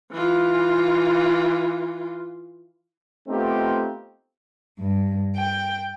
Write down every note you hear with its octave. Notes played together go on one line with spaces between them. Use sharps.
E3 F4
A3 B3 C4 D#4 F4 G4
G2
G5